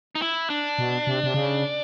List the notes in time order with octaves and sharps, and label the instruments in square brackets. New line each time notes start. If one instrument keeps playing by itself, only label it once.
[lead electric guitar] D#4
E4
D4
[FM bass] B2
C3
C3
C#3